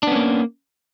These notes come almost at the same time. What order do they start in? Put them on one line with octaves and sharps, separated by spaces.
D4 B3 C#4 A#3